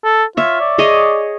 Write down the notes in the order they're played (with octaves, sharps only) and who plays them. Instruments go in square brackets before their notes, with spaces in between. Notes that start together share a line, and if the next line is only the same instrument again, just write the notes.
[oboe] A4
[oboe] F4 [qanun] C#5 E5
[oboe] D5
[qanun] G#4 C#5 D#5